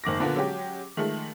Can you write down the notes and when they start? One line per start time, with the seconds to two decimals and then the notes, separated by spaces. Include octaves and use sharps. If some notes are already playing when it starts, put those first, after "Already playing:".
0.04 F#1 D#3 D6 A#6
0.20 A#2 D3 F3 A#3 B3
0.36 F#3 G#3 C#4 G4
0.97 D#3 F3 G#3 A3